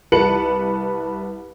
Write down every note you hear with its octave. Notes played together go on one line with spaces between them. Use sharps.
C2 B4 A5 C#7 F#7